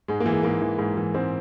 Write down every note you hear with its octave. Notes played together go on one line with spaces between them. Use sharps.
G#2 G#3
A#3
E3
G#3
G#2 A#3
E3
G#2
E3
G#2 C4